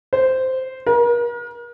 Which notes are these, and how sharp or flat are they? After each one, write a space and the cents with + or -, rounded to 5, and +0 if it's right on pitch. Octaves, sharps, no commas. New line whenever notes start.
C5 -10
A#4 +40